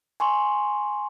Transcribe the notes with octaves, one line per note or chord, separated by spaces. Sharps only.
G#5 C6 C#6